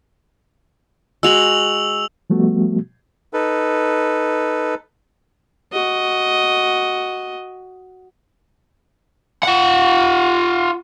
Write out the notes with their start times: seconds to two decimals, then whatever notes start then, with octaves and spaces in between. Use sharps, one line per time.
1.23 G#3 F#4 E6 F7 F#7
2.30 F3 G3 A3 B3 F#4
3.33 D#4 A4 B4
5.73 F#4 D#5
9.43 F4 F#5